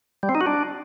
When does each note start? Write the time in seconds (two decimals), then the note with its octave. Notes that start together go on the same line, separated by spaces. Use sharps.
0.23 G3
0.29 C4
0.35 D#4
0.41 F#4
0.46 D4